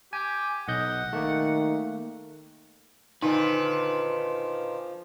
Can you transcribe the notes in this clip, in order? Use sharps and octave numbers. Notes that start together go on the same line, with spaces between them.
G4 G#5
B1 D#5 F#5 G6
D#3 A3 A#3
A#2 D3 D#3 F3 D#4 B4